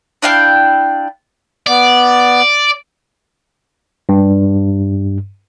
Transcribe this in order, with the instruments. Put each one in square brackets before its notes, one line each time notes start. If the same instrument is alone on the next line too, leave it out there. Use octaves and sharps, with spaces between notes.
[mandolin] D4 E4 F5 G5
[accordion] B3 [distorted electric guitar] D5
[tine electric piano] G2